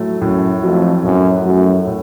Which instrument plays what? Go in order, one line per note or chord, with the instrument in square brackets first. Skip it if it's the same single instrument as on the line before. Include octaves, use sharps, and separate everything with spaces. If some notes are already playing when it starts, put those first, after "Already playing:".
Already playing: [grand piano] A2 F#3 A3
[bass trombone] F#2 [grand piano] A2
[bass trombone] F2 [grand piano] F#3 A3
[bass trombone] F#2 [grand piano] A2
[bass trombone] F#2 [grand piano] F#3 A3
[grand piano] A2